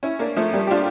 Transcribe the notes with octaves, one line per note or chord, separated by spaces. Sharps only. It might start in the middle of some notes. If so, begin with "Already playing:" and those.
C#4 E4
A#3 D4
F3 A3
G3 A#3
G4
D4 F4